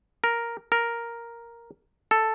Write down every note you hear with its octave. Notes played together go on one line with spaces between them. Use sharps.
A#4
A#4
A4